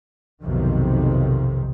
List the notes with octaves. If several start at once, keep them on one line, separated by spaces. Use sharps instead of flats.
B1 F2 C3 D#3